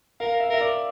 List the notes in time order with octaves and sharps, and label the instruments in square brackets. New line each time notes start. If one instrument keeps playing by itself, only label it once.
[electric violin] A#4 [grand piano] F5
[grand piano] E5
[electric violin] A#4 [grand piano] E5
[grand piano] D5